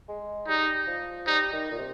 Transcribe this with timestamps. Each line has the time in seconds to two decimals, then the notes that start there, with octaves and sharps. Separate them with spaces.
0.09 G#3
0.48 G3 D#4
0.87 F3
1.27 G3 D#4
1.53 D#3
1.72 A#2
1.78 C3